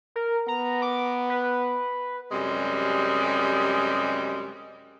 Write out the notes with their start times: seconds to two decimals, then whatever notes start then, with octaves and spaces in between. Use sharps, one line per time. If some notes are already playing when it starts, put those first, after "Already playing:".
0.16 A#4
0.48 B3 A#5
0.82 D6
1.30 B4
2.32 F#2 C3 G3 G#3